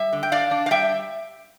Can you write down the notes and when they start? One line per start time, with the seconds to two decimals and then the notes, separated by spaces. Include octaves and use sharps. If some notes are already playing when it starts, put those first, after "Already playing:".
Already playing: G3 E5
0.13 D3
0.23 G5
0.32 D4 D5 F5
0.51 D4
0.66 F5
0.71 G3 E5 G5